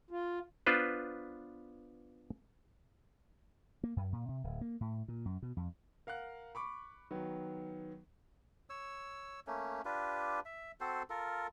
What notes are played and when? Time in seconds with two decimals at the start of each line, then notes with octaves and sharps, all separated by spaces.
0.11 F4
0.66 B3 D4 F4 B4 C5
3.84 A#3
3.96 F#2
4.13 A#2
4.29 C3
4.44 D1
4.61 A#3
4.81 A2
5.08 A#2
5.25 F#2
5.42 B2
5.57 F2
6.07 A#4 F5 F#5 F#6
6.55 B5 C#6 D6
7.11 D#3 F#3 B3
8.70 C#5 E6
9.47 A3 A#3 C#4
9.85 D4 F4 G4 B4
10.45 E5
10.81 C4 F#4 A4 C5
11.10 F4 A4 A#4